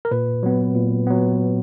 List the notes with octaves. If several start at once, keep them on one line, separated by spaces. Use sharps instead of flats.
A#4
A#2 B4
F#3 B3
A#2
F#3 B3